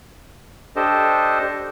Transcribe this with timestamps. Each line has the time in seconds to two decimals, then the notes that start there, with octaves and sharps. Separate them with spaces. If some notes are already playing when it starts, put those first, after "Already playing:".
0.76 D4 G4 A4 C5 D#5